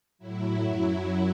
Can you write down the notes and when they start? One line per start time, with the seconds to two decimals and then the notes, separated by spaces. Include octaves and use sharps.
0.19 A2 F#3 E4
0.63 F#2 F#3 E4